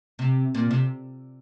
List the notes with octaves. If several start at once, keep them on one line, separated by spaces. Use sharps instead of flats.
C3
A#2
C3